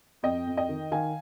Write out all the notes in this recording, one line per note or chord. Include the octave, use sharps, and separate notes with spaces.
F2 D#5 G5
F2
D#5 G5
D#3
D#3 F5 G#5